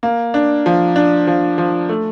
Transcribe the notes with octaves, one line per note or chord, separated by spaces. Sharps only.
A#3
D4
F3
D4
F3
F3
A3